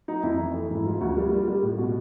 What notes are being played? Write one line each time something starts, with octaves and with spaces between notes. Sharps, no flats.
F#3 D#4
F2 E4
E3
A3
G#2 E4
F3 F4
D2 F#4
G3 F4
G3
G3
A2
B2 F#4